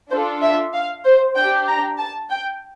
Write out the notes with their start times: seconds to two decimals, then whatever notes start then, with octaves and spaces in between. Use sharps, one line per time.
0.11 D4 F4 A4 C5
0.42 E5
0.74 F5
1.05 C5
1.36 D4 G4 G5
1.67 A#5
1.98 A5
2.30 G5